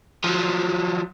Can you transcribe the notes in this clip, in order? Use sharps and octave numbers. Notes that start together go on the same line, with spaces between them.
F3 F#3